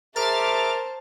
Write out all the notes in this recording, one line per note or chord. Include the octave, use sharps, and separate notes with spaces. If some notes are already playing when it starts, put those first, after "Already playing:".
G#4 A#4 C5 E5 A5 D6 F6 A6